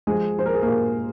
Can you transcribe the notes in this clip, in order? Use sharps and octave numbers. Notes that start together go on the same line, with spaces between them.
F3 G#3 G#4
F3 C5
A#4
G#4
A#3 A#4
A#2